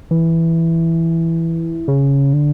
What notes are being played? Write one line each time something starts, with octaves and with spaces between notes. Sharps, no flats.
E3
C#3
D3